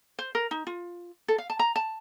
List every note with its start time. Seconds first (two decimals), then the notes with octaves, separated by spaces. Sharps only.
0.19 C5
0.35 A#4
0.51 D#4
0.67 F4
1.28 A4
1.38 F5
1.50 A5
1.59 A#5
1.76 A5